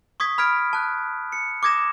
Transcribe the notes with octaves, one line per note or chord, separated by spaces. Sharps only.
C#6 D#6 G#6 B6
B5 F6 G#6 B6 D7
A5 F#6
C#7
D6 D#6 G#6 A#6 E7